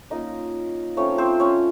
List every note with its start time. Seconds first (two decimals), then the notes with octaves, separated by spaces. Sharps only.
0.10 A#3 C#4 D#4 F4 D#5
0.97 F3 A3 C4 C#4 D#4 C#5
1.18 C4 C5
1.40 C#4 C#5